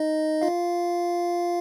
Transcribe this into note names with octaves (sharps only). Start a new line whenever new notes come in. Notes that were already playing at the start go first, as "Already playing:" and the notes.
Already playing: D#4 D#5
F4 F5